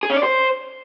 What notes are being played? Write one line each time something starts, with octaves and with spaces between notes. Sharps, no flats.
G#4
C#4
D5
C5